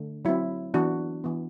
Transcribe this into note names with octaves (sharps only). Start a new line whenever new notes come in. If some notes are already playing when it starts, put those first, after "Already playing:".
Already playing: D3 A3
F#3 C4 E4
E3 B3 D4 F#4
E3 B3